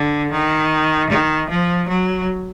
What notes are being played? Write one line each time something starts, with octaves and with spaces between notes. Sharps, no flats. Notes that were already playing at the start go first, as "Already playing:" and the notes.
Already playing: D3
D#3
D#3
F3
F#3